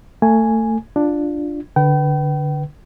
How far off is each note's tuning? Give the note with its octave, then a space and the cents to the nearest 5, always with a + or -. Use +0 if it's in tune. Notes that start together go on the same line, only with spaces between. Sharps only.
A3 +25 G#5 +0
D4 +5 F4 +0
D3 +0 B4 +0 G5 -35